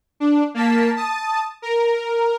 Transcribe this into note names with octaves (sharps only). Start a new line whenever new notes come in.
D4
A#3 A5 B6
A5 D#6
A#4